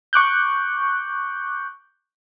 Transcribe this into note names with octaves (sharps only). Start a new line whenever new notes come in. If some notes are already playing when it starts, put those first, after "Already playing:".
C#6 D6 F#6 G6